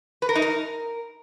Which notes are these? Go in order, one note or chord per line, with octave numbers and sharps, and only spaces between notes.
B4
A#4
D#4
A#4